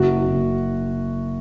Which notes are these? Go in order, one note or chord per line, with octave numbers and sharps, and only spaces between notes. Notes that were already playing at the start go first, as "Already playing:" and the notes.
Already playing: F#1 F#4
F#1